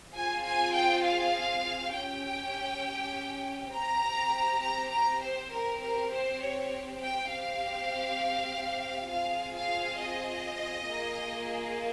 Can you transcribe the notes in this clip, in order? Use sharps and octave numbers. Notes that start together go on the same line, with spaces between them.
C4 F4 G#4 G#5
G#5
G5
F5
C#4 G4 G5
C4 G4 A#5
A#5
A#5
C5
C4 G4 A#4
A#4
C5
C#5
G5
C4 G4 F5
C4 F4 G#4 F5
F5
D#5
A#3 F4 G#4